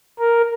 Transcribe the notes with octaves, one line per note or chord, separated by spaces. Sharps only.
A#4